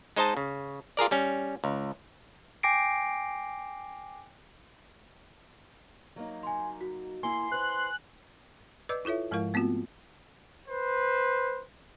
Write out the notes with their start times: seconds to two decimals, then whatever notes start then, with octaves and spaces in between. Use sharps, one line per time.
0.16 G#3 D#4 C5 D#5 A5
0.37 C#3
0.97 F4 G#4 A#4 D5
1.11 G3 C#4
1.64 C#2
2.63 G5 G#5 D6 A#6 C7 D7
6.16 F#3 A#3 D#4
6.43 G#5 C6
6.81 F#4
7.23 A#3 E4 G#5 C6
7.52 B4 C5 F#6
8.89 B4 D5 D#5 D6 E6 G6
9.05 E4 F4 A4 C#5 E5
9.31 G#2 F3 G#3 E4 A#4 F5
9.54 A3 B3 C4 F4 F#4
10.68 B4 C5